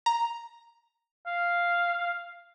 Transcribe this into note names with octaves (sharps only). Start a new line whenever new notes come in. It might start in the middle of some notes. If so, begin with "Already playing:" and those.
A#5
F5